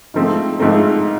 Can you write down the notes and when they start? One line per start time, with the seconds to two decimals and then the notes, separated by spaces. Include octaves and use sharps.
0.14 G#2 F3 A3 C4
0.60 G#2 F3 A3 C4